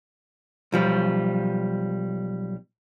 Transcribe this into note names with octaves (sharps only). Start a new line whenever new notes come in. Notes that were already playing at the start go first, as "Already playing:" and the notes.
B1 F3 G3